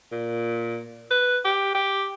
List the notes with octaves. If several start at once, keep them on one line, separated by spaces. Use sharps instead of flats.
A#2
B4
G4
G4